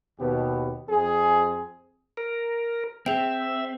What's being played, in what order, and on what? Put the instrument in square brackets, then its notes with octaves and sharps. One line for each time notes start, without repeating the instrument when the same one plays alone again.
[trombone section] D#2 B2 B3 G4
F2 C4 G#4
[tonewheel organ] A#4
[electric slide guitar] C4 [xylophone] G#4 G5 [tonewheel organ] E5